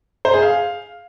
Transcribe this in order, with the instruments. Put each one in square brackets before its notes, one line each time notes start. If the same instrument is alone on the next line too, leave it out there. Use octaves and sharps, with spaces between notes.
[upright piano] C5
G#4
F5